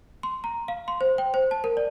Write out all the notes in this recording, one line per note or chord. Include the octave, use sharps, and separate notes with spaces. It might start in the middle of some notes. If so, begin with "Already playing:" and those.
C6
A#5
F5
C6
C5
G5
C5
A5
A#4
D5